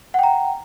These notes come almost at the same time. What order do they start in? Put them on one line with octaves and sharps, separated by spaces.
F#5 G5 A#5